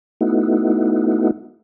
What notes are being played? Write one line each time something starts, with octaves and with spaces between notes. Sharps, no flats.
A3 B3 D#4 E4 F#4